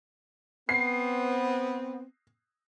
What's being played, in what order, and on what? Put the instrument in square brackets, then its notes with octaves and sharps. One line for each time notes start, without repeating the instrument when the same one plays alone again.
[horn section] B3 C4 [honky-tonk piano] C7